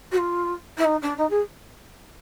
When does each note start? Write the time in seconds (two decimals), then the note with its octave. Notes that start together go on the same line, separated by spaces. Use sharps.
0.12 F#4
0.17 F4
0.77 E4
0.84 D#4
1.02 D4
1.17 D#4
1.30 G#4